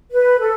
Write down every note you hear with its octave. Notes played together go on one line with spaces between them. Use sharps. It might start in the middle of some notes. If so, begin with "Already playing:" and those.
B4
A4